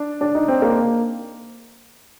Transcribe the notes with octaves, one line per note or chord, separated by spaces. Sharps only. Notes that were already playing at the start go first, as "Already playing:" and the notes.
Already playing: D4
D4
D#4
C4
A#3